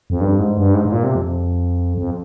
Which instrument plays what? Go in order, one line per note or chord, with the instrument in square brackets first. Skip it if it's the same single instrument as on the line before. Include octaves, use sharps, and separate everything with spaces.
[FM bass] F2
G2
G#2
G2
G#2
G#2
A#2
C3
F2
F2